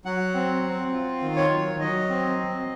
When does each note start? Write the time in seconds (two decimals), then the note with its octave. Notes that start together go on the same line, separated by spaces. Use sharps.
0.05 F#3 F#5
0.34 C4
0.63 C4
0.93 F4
1.22 D#3
1.36 C#5
1.50 F#3
1.80 F#3 D#5
2.09 C4
2.38 C4